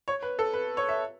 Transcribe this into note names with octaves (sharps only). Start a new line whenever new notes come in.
C#5
B4
A4
B4
C#5
E5